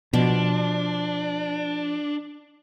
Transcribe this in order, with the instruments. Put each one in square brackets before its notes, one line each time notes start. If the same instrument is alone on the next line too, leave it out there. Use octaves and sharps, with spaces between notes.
[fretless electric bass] B2 [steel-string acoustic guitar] F3 [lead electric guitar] D4